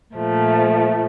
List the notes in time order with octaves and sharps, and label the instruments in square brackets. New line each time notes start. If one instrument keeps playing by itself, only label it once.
[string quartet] A#2 F3 A3